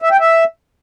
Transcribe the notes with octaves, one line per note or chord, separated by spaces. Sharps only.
E5
G5
E5